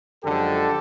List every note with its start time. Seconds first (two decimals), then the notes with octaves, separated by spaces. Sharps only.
0.23 F#2 D3 F3 G#3 G4 A4